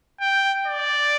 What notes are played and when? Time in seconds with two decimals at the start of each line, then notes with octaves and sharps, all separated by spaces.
0.21 G5
0.67 D5